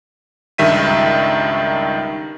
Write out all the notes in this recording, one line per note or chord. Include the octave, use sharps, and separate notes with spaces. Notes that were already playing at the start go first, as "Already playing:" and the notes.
C#2 G2 D#3 E5 B6 D#7